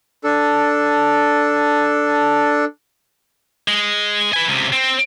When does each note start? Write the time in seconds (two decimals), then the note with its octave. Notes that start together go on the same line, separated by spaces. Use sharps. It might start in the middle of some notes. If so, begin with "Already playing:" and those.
0.24 D4 A4
3.68 G#3
4.33 B4 G#5
4.48 C#2 C3
4.72 C4